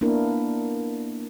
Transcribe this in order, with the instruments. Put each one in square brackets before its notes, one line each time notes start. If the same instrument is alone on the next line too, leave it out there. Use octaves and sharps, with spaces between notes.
[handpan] A#3 B3 D4 E4 A#4